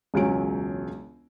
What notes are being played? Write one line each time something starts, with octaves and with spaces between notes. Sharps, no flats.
E1 C#2 F#3 C#4 D7